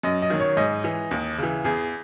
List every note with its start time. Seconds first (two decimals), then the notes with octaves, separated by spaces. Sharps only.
0.03 F#2 D#5
0.22 D#5
0.30 D#3 F#3
0.40 C#5
0.57 G#2 D#5
0.84 E3
1.11 D#2
1.38 C#3 E3
1.64 E2 G#4